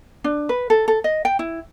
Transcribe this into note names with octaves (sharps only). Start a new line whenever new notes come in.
D4
B4
A4
A4
D#5
G5
E4